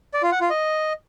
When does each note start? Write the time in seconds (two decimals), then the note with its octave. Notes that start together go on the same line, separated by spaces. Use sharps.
0.14 D5
0.23 F4
0.32 F#5
0.41 F4
0.50 D#5